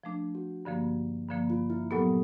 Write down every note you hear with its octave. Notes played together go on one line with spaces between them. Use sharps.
F3 A3 D4
F#4
G2 D3 F3 A#3
G2 D3 F3 A#3
F4
E4
A#2 F#3 B3 G4 A4